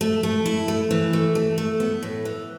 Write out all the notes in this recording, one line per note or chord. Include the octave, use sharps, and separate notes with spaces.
A3
A3
E4
A3
E3
A3
A3
A3
B3
A2
E3